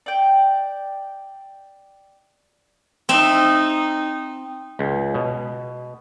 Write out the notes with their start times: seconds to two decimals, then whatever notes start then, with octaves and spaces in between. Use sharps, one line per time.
0.06 D5 G5
3.09 C4 D#4 E5
4.79 C#2
5.14 B2